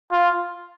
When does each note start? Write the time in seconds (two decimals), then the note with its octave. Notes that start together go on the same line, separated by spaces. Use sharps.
0.12 F4